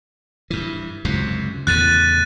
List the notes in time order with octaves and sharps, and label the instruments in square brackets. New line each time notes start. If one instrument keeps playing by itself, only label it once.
[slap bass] G2 E3
C#2 F#2 C3
[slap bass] E2 A2 C#3 [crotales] F#6 A6 D#7